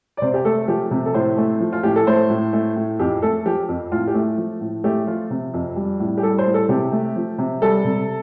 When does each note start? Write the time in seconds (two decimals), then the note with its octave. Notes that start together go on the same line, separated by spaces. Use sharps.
0.17 D5
0.22 C3 C5
0.34 G4
0.45 A3 A4
0.68 F3 G4
0.91 C3 G4
1.06 A4
1.14 A2 C5
1.37 A3
1.60 F3
1.72 F4
1.83 A2 G4
1.96 A4
2.07 A3 C5
2.30 A2
2.53 A3
2.76 A2
2.99 F2 G4
3.22 A3 A4
3.46 F3 G4
3.69 F2
3.92 A2 F4
4.08 G4
4.14 A3
4.37 F3
4.61 A2
4.84 A3 G4
5.07 F3 F4
5.30 C3
5.54 F2
5.76 G3
6.00 A2
6.17 G4
6.23 G3 A4
6.38 C5
6.46 A2
6.54 A4
6.69 C3 G4
6.92 A3
7.16 F3
7.38 C3
7.62 G3 A4
7.85 C3